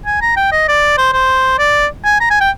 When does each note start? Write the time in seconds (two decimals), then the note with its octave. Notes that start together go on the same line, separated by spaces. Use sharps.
0.06 G#5
0.22 A#5
0.37 G5
0.52 D#5
0.68 D5
0.98 C5
1.13 C5
1.59 D5
2.05 G#5
2.20 A#5
2.30 G#5
2.41 G5